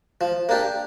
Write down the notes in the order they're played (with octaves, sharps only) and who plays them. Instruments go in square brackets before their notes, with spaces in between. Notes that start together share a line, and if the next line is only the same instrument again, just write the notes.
[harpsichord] F3
A#3 D4 G4